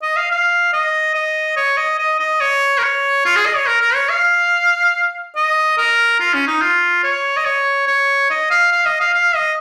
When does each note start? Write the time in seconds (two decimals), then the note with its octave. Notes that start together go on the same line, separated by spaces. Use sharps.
0.02 D#5
0.17 F5
0.31 F5
0.73 D#5
1.15 D#5
1.57 C#5
1.77 D#5
1.99 D#5
2.20 D#5
2.41 C#5
2.78 A#4
2.83 C#5
3.25 F4
3.36 G#4
3.46 D#5
3.56 C#5
3.67 A#4
3.81 A#4
3.95 C#5
4.09 F5
5.36 D#5
5.78 A#4
6.20 F4
6.34 C#4
6.47 D#4
6.62 F4
7.04 C#5
7.37 D#5
7.46 C#5
7.88 C#5
8.30 D#5
8.50 F5
8.72 F5
8.86 D#5
9.00 F5
9.14 F5
9.35 D#5